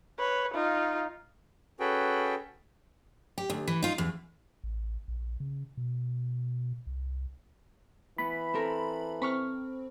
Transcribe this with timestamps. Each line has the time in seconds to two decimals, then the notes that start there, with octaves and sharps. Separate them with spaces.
0.19 B4 C#5
0.54 D#4 F4
1.80 C#4 F#4 G#4 A4 B4 G5
3.38 G4
3.50 D2
3.68 E3
3.82 D#4 F4
3.98 E2
4.64 A1
5.08 A#1
5.40 C#3
5.77 B2
6.87 C2
8.18 E3 B3 B5
8.54 C4 A4 A#4
9.22 C4 B5 C#6 F6